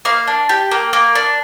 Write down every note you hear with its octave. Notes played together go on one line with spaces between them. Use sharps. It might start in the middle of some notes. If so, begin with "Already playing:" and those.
A#3 F5
D4
G4
A#3
A#3
D4